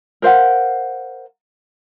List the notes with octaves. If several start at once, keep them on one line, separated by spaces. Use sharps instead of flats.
A#4 C5 F5 F#5